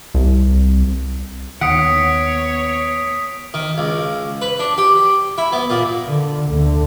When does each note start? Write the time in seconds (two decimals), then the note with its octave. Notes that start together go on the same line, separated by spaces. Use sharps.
0.14 C2
1.61 D#2 D#3 B3 C#5 F#5 D#6 B6 D7
3.54 D#3
3.78 C#2
4.42 B4
4.59 D4
4.78 G4
5.38 E4
5.52 B3
5.70 A#2
6.07 D3
6.47 D2 D3